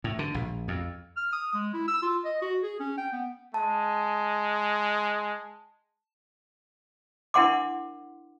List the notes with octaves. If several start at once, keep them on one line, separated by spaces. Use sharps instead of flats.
A2
D3
A#1
F2
F6
D#6
G#3
E4
E6
F4
D#5
F#4
G#4
C#4
G5
B3
G#3 A5
D4 E4 A#4 F#5 C6 D6